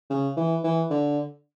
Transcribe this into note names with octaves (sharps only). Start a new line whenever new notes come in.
C#3
E3
E3
D3